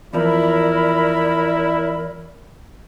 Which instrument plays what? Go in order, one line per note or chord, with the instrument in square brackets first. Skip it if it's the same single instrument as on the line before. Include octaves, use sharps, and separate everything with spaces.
[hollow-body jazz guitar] E2 F3 [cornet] E4 [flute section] A#4 B5 [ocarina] D5